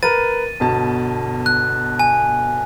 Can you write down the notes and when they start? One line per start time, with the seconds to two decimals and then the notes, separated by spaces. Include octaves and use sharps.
0.03 A#4 B4 A6 D#7
0.60 G1 B2 A5
1.46 F#6
1.99 G#5